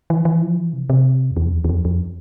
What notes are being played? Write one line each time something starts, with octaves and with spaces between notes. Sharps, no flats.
E3
E3
F3
E3
C3
C3
F2
E2
F2
E2
E2
F2
F2